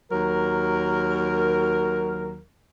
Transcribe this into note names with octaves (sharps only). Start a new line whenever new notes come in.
D#2 F#3 A#4